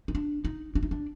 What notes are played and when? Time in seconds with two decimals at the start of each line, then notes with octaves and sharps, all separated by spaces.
0.08 D#4
0.15 D4
0.45 D#4
0.75 D4
0.83 D#4
0.91 D4